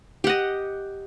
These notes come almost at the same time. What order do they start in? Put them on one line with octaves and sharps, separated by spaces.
G4 F#5 D#5